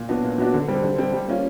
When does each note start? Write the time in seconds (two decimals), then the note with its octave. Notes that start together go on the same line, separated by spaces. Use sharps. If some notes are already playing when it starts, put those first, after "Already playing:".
Already playing: A#2
0.09 F#3 B3 D4 F#4
0.24 A#2
0.38 F#3 B3 D4 F#4
0.53 D3
0.68 G3 C4
0.83 D3
0.98 G3 C4
1.13 G3
1.28 A#3 C#4 F4